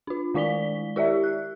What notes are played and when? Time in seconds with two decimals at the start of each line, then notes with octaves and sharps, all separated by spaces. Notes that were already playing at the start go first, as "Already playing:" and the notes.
0.07 D4 F4
0.34 D#3 G#3 E4 D5 B6 G7
0.96 E4 G4 D5 E5
1.24 F#6